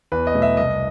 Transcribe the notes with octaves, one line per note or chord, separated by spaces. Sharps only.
E2 B4
D#5
B2 F#3 A3
E5
C2 D#5